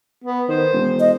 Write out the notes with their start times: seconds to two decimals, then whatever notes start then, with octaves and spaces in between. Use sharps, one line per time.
0.24 B3
0.48 D#3 C5
0.73 E1
1.00 D#5